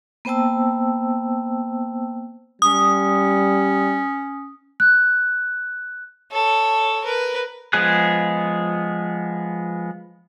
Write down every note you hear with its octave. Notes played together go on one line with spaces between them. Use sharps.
A#3 B3 C5 G5 A5 E6
G3 C#4 D#6
F#6
A4 C#5
A#4 B4
F3 G#3 B3 G#4 F#6